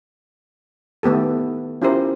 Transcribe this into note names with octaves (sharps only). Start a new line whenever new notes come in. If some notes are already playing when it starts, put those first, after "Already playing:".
D#3 A3 B3 G4 A4
C#4 E4 F4 G4 A#4 C5